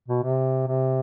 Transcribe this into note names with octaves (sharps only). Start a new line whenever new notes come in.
B2
C3
C3